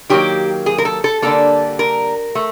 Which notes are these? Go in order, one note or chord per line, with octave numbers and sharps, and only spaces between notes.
D#3 F#3 A#3 G4
G#4
A#4
A4
A4
D3 G3 A#3 A4
A#4
A3